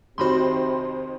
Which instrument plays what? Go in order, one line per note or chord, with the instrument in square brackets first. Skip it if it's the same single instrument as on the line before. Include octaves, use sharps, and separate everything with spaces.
[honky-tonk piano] F2 D#3 C5 [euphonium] C3 [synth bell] F#4 B5 C6